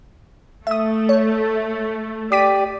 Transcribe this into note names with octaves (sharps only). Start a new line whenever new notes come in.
A3 E5 D#6
C#5
G4 D5 D6 B6 D#7